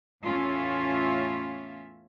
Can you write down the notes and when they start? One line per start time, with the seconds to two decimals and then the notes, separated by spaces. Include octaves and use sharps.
0.23 E2 A2 C#4 F4 E5